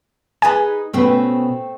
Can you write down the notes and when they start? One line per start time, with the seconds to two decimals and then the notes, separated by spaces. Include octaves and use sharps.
0.42 D#4 G#4 B4 G#5
0.94 B2 A3 C4 C#4 B4